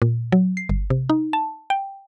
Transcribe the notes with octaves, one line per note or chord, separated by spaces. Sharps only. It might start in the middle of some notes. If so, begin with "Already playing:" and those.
A#2
F#3
C7
G1
C3
D#4
A5
G5